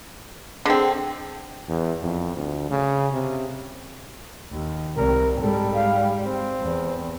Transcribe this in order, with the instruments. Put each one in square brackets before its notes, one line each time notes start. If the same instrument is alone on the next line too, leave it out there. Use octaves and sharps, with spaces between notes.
[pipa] D3 C4 [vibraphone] G#4 G5
[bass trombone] E2
F2
D2
C#3
C3
[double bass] D#2
[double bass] C2 [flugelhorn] A#4
[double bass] G#2 G3 [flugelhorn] A4
[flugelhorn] F5
C4
[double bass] E2